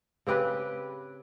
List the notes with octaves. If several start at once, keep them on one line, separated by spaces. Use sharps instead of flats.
C#3 C4 G4 B4